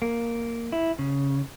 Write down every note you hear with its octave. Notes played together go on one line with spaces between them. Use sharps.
A#3
E4
C#3